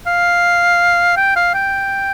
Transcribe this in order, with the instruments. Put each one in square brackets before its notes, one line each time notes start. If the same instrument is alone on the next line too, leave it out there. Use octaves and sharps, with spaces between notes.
[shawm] F5
G5
F5
G5